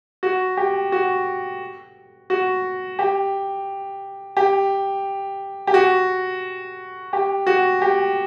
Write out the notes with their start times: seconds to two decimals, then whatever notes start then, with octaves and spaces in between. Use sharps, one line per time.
0.23 F#4
0.57 G4
0.92 F#4
2.30 F#4
2.99 G4
4.37 G4
5.67 G4
5.74 F#4
7.13 G4
7.47 F#4
7.82 G4